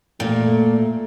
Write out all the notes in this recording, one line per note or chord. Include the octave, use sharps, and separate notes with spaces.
A#2 A3